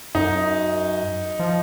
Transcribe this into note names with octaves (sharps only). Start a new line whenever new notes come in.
F#2 D#4
F3